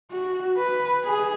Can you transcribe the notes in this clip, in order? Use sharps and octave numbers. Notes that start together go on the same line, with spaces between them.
F#4
B4
G#4